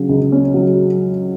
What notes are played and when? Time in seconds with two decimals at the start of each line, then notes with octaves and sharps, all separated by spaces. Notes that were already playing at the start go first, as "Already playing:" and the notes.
Already playing: C#3 F#3
0.09 C#2
0.32 C#4
0.54 F#3